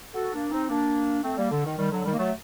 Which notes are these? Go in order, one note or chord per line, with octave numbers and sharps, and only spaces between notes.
F#4 A4
A#3 D4
C4 D#4
A#3 D4
A3 C4
G3 A#3
D3
D#3
D#3 G3
D3 F#3
D#3 G3
A#3
F#3 A3